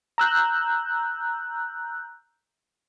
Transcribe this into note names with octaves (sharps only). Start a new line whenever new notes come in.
A#5 E6 F#6 G6